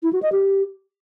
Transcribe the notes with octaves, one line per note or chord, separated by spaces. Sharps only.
E4
F#4
D#5
G4